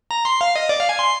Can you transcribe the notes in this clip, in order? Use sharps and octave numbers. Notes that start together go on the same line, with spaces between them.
A#5
C6
F5
D#5
D5
F5
G#5
C6